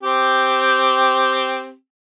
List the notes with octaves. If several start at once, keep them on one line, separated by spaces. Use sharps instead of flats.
C4 G4